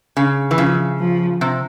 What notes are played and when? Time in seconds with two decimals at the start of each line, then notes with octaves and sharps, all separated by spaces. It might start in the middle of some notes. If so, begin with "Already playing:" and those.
0.17 C#3
0.51 E3
0.58 C#3 F3
1.00 F3
1.41 C3